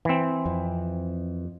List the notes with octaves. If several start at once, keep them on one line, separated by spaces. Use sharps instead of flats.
E3 C4
F2